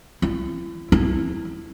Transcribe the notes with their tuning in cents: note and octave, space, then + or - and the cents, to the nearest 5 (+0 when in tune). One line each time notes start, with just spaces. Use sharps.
E4 +35
E4 +0